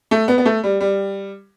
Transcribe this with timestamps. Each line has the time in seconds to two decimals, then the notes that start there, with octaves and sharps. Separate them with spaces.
0.11 A3
0.28 B3
0.38 B3
0.46 A3
0.64 G3
0.80 G3